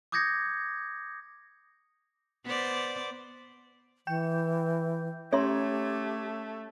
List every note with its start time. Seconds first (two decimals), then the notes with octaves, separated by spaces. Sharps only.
0.12 D6 D#6 G6 G#6 A#6 C#7
2.45 B3 C5 D5
4.07 E3 G5 G6
5.33 A3 C#4 G4 C#5 E5 C6 G#6